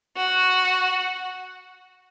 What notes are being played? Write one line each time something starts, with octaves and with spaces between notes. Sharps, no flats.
F#4